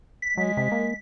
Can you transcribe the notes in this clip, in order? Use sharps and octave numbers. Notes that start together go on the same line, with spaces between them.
B6
F#3 G#3
C3
A#3